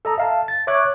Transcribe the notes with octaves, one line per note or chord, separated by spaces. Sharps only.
A4 D#5 A#5
E5 F5 A5
A6
C#5 E5 C#6 D6 F#6 G#6